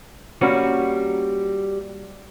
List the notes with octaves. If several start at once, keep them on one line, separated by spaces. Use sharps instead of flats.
G3 A#3 C#4 F#4 B4 C#5